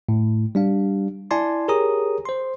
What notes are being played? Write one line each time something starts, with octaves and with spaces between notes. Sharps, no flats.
A2
G3 D4 F5
E4 D5 G#5 A5 C6
G4 G#4 A#4 C#5 A#5 D#6
C5 C6